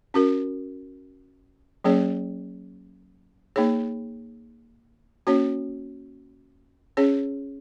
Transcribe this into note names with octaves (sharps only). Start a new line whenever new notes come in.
C#4 F#4 A#4
F#3 A#3 C#4 G#4 C#5
A#3 D#4 G#4 C#5
A#3 C#4 F#4 C#5
C#4 G#4 C#5